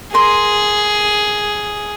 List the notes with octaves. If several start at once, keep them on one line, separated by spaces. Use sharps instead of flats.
G#4 A#4 C6